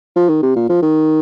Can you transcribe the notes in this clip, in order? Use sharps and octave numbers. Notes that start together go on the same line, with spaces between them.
F3
D#3
C3
A#2
F3
D#3